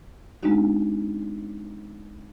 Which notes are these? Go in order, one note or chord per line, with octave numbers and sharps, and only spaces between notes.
G#3 B3 C4 D4 D#4 F#4